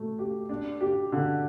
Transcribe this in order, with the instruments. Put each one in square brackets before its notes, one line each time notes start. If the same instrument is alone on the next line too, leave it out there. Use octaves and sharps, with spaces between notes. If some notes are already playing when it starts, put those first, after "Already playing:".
Already playing: [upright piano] A3
G4
D4
G4
D3